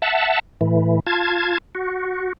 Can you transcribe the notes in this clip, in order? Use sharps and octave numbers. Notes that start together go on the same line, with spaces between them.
E5 F#5 A5
A2 E3
F4 A5 G#6
F#4